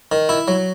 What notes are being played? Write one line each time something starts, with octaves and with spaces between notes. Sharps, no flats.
D#3
E4
F#3